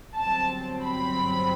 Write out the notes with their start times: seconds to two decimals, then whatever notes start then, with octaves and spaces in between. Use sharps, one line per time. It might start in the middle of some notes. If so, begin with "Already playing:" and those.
0.16 G1 G2 F#3 C4 A5
0.83 B5